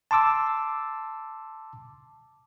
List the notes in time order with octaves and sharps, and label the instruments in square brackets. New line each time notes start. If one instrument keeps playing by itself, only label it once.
[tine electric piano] A5 C6 D6 E6